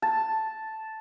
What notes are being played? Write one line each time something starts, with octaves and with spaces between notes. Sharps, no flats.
A5